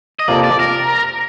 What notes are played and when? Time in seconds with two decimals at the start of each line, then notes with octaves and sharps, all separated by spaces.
0.19 D#5
0.28 F2 C3 F3 A#3 D4 D5
0.44 D5
0.59 A#4